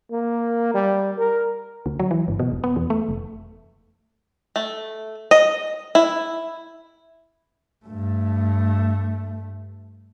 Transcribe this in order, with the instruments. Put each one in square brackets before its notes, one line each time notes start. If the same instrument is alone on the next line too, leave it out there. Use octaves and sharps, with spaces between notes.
[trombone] A#3
G3
A#4
[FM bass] D2
F#3
E3
G1
B2
E1
B3
E2
A3
F1
[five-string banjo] A3
D#5
E4
[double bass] G2 A3